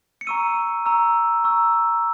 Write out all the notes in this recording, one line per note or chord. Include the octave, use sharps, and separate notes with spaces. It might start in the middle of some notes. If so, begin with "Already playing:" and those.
C#7
A#5 C#6 E6 D#7
A#5 C#6 E6
A#5 C#6 E6